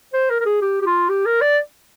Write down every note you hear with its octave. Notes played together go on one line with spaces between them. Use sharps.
C5
A#4
A#4
G#4
G4
G4
F4
G4
A#4
D5